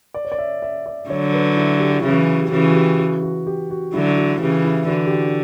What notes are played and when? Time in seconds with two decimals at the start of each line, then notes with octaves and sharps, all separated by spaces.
0.14 D5
0.25 C#5
0.32 D5
0.38 E5
0.62 E5
0.86 D5
1.09 D3 F#3 C#5
1.34 B4
1.57 E4
1.80 G4
1.91 F#4
2.01 C#3 E3 E4
2.11 F#4
2.41 G4
2.51 C#3 E3 F#4
2.69 F#4
2.75 G4
2.99 F#4
3.23 F#4
3.47 G4
3.70 F#4
3.94 D3 F#3 E4
4.17 F#4
4.41 C#3 E3 G4
4.65 E4
4.88 D3 F#4
5.06 G4
5.12 F#4